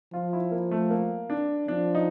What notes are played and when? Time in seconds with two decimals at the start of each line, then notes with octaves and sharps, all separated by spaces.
0.13 F3 F4
0.33 E4
0.51 A#3
0.71 A3
0.90 A#3
1.30 D4
1.68 F3 D4
1.95 D#4